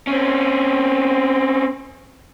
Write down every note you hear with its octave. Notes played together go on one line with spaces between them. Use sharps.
C4 C#4